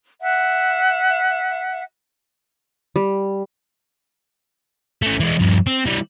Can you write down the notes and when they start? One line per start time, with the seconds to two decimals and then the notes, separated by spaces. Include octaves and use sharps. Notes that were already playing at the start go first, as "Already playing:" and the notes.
0.20 E5 F#5
2.96 G3
5.02 A3 C#4
5.20 E3 G#3
5.39 G2 F3
5.67 C4
5.86 E3 G3